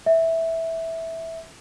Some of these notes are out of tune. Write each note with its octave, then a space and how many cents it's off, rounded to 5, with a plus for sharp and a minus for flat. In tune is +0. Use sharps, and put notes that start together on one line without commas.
E5 -10